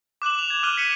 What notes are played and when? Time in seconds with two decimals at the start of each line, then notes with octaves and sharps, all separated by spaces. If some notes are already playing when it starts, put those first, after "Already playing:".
0.22 D6 F#6 E7 F#7
0.39 F7
0.50 G#6
0.63 D6 F6 F#6 D#7 G7
0.77 B6 C#7 D#7